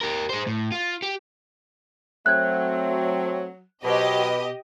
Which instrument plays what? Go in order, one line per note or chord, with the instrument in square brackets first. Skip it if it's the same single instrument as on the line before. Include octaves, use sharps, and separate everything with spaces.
[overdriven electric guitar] G4 A#4
G#4 C5
A2
F4
G4
[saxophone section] F#3 [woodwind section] A3 C4 [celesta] F#6 G#6
[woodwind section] B2 [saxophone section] F#3 B3 C5 [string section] G4 D#5